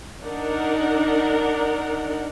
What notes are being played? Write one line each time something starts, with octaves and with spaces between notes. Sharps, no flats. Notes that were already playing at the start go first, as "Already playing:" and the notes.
D4 D#4 A#4 F#5